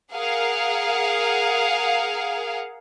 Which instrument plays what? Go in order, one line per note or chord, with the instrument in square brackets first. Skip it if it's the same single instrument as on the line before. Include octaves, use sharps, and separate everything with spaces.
[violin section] G#4 A#4 F5 F#5